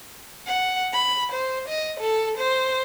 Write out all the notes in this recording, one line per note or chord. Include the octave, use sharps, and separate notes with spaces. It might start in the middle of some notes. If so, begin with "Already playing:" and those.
F#5
B5
C5
D#5
A4
C5